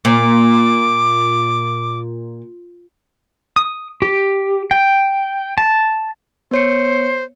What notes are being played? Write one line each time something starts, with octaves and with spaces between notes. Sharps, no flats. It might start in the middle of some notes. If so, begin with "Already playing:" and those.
A#2 D6
D#6
G4
G5
A5
B3 C5 C#5 C#7